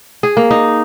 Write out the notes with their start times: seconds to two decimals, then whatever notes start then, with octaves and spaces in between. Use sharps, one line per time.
0.23 G#4
0.37 A#3
0.51 D#4